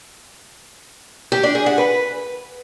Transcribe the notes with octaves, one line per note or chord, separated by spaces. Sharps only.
G4
D4
G#4
F#5
B4